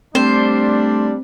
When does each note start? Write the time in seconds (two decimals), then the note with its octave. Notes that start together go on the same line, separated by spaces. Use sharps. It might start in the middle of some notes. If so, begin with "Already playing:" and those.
0.15 G3 A3 C4 D4 C5